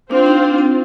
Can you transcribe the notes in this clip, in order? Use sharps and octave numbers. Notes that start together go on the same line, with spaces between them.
C4 D4 F4 C5
D#4
D4
C4